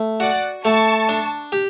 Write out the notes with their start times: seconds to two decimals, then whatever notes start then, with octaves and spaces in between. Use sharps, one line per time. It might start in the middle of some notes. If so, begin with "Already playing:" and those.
Already playing: A3
0.20 F#4 D5 F#5
0.64 A3 A5 C#6
1.09 D4
1.52 G4